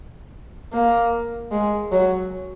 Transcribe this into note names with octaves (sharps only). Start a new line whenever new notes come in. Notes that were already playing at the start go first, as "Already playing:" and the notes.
A#3
G#3
F#3